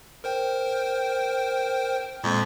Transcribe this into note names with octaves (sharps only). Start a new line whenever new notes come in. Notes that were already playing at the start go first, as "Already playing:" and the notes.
A#4 C5 G5
F2 A#2 G#3 A#3